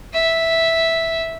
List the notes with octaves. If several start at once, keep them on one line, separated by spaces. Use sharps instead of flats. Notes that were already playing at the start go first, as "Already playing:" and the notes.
E5